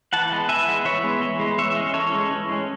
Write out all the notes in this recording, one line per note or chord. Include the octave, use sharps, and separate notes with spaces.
E3 F#5 A5
G#3 B3
E3 E5 G#5
G#3 B3
E3 C#5 E5
G#3 B3
E3
G#3 B3
E3 C#5 E5
G#3 C#4
E3 A4 C#5
G#3 C#4
E3
G#3 C#4